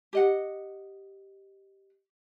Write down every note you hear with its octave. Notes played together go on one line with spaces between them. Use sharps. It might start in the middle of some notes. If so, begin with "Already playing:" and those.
G4 D#5 F#5